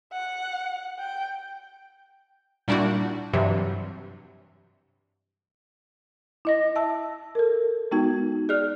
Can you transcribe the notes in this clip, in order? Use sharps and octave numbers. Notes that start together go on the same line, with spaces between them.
F#5
G5
A#2 G3 D4 E4 F#4
G2 C3 E3 F#3
E4 D#5 A#6
E5 A5 E6
A4 A#4
G#3 B3 D#4 F#4 G5 G#6
G#4 D5 F6 F#6